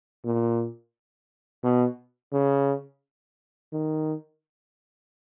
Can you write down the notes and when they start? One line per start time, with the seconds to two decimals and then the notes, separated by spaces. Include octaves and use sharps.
0.25 A#2
1.63 B2
2.33 C#3
3.72 D#3